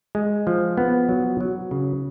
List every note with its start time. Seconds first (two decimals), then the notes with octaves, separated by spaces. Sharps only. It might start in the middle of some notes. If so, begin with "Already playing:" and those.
0.15 G#3
0.47 F3
0.77 B3
1.09 F#3
1.41 F#3
1.71 C#3